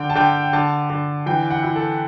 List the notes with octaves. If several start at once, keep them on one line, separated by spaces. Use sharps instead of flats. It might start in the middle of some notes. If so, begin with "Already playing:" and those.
Already playing: D3 G5
A5
D3 G5
D3 A5
D3
E3 G5
F#5
E4
A4